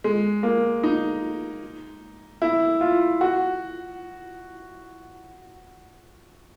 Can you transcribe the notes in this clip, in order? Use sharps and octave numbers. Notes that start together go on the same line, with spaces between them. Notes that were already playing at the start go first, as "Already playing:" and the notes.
G#3
A#3
D#4
E4
F4
F#4